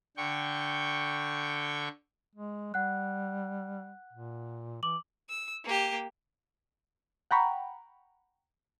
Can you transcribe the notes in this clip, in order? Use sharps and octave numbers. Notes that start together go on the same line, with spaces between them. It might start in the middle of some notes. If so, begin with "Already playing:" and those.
D3 G5 C#6
G#3
G3 F#5 F#6
A#2
E3 D6 F#7
E6
A#3 G4
F#5 G5 A#5 B5 C#6